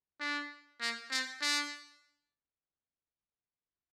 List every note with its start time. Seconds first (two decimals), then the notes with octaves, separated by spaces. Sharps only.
0.20 D4
0.81 A#3
1.10 C4
1.42 D4